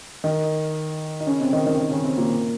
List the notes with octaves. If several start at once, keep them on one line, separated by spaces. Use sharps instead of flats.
D#3 D#4
D#4
C#3 C#4
C3 C4
D#3 D#4
D#3 D#4
D#3 D#4
C#3 C#4
C3 C4
A#2 A#3